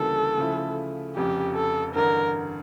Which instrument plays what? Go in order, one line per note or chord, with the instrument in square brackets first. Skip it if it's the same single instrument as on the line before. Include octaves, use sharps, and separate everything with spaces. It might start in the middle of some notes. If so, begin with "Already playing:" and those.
Already playing: [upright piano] D2 C#3 E3 G3 A#3 [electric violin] A4
[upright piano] C#3 F3 A3 E4
[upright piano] F1 F2 C#3 [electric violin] G4
[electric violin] A4
[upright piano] A1 G2 D3 [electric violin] A#4